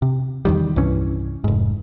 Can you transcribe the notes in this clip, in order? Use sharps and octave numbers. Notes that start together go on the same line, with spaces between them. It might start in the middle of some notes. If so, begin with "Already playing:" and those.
C3
E2 D#3 G3
C2 G2 E3 C#4
F1 G#2